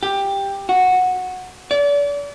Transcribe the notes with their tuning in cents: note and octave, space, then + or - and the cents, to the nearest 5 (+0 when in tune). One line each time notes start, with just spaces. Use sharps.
G4 +10
F#4 -10
D5 -35